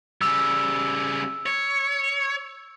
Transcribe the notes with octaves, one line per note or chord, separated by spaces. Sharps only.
C#3 G3 E6
C#5